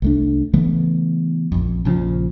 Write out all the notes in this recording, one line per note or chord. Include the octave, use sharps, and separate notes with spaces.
C2 A3 D4
C#3 E3 A3 B3
A#1 F2
A#1 C#3 E3 F3